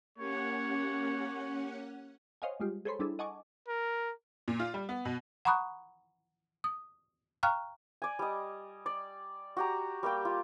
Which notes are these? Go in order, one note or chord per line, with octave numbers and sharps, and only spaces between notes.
A#3 C#4 G4 C#5 F#5
C5 C#5 D#5 F5 F#5 G#5
G3 G#3 F4 G4
G#4 A4 C5 C#5 B5 C6
G3 D4 E4 G#4 A4
D#5 F#5 G#5 A5 C#6 D6
A#4
A#2
F4
G3
B3
B2
F#5 A#5 B5 C#6 D#6 F#6
D#6
F5 G5 A#5 C#6 F6 F#6
D5 G#5
G3 D#5
D5
F#4 G4 A#5
G3 A#3 G4 G5
F4